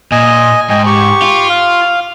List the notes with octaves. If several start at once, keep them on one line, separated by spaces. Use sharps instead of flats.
A#2 D#5 G#5
G#2 D#5 G5 G#5
G4 C#6
F4
F5